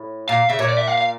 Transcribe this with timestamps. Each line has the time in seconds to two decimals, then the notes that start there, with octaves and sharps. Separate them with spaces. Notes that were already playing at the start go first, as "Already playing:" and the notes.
Already playing: A2
0.29 A#2 F5
0.49 C#3 E5
0.59 A#2 C#5
0.69 D5
0.78 E5
0.87 F5
0.98 F5